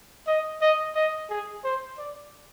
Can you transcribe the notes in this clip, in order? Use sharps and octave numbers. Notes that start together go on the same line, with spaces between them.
D#5
D#5
D#5
G#4
C5
D5